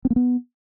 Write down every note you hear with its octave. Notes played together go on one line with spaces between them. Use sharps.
C4
A#3
B3